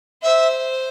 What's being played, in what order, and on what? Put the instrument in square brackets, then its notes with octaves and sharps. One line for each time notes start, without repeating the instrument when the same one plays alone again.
[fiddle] C5 [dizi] E5